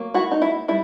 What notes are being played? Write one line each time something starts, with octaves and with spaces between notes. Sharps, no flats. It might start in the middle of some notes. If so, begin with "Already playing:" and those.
Already playing: F#3 A#3
E4 F#4
D#4
E4
G3 E4